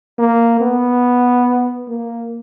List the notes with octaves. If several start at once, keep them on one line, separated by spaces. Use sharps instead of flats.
A#3
B3
A#3